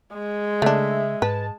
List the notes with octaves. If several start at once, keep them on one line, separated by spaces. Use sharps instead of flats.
G#3
C#3 A3 D4 E5
G#2 B4 A5